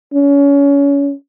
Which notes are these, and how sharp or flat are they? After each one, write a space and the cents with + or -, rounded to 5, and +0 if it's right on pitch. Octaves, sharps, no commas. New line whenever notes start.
C#4 +30